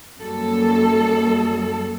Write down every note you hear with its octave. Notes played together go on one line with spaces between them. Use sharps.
F#2 G3 A#3 A4